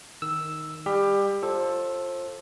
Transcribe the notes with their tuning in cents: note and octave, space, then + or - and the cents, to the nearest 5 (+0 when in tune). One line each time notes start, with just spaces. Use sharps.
D#3 +0 E6 +0
G3 +25 G4 +20
F4 +0 A4 +0 C5 +30